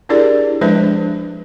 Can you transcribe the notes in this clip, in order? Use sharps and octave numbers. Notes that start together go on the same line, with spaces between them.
D4 E4 G4 G#4 A#4 D5
F3 G#3 D4 B4 C5 E5